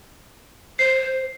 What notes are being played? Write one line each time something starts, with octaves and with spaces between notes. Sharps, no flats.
C5 C7